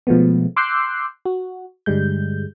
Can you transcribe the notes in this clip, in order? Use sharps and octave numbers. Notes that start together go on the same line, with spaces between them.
B2 F3 G#3 A3 B3
C6 D6 E6 F#6 G6 C7
F#4
G2 D3 G3 G#3 G6